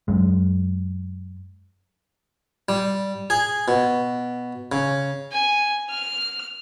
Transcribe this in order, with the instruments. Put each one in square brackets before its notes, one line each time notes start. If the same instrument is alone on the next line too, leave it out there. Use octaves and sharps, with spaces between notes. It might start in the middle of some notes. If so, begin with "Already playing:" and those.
[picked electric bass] F#2 G#3
[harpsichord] G3
G#4
B2
C#3
[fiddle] G#5
F6